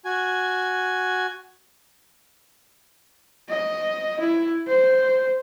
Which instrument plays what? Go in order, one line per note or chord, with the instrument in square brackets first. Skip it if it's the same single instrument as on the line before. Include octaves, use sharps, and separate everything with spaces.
[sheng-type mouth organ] F#4 G#5
[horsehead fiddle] D#5
E4
C5